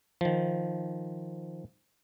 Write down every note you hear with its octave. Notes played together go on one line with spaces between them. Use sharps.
D#3 F3